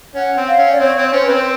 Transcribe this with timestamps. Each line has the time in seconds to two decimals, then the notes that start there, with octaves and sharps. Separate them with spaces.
0.15 C#4 F#5
0.37 C4
0.48 F5
0.58 C#4
0.72 D5
0.80 C4 C#5
0.97 C4
1.13 C#4 C5
1.24 C4 B4
1.34 C5